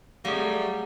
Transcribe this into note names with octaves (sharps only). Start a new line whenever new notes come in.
F#3 G3 A3 C4 G#4 F5